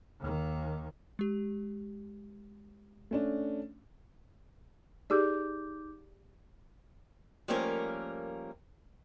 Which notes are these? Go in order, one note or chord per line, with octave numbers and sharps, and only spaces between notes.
D#2 D#3
G#3 G4
A3 C#4 D4
D#4 G4 G#4 D5 D6 G6
F3 G3 A3 A#3 C#4 A#4